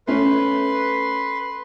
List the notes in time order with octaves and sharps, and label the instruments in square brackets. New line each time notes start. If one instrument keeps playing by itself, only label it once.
[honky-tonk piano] A3 C#4 [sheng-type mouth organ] B4 C6